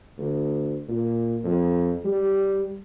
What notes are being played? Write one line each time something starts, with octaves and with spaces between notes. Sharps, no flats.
D2
A#2
F2
G3